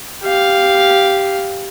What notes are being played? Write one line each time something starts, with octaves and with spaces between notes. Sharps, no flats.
G4 F5